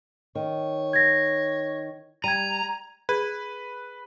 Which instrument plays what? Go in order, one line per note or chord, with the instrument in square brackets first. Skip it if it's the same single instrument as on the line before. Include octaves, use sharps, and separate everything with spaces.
[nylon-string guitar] D#3 [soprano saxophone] C#5
[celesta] G#6 A#6
[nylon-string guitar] G3 [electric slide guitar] A#5 [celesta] G#6 D#7
[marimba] G#4 [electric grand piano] B4